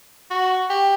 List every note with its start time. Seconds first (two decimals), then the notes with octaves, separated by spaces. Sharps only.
0.31 F#4
0.70 G4